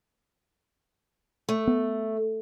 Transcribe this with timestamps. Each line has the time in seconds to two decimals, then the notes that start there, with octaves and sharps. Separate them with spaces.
1.49 A3
1.67 B3